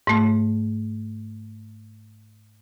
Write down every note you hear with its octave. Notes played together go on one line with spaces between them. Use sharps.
G#2 A3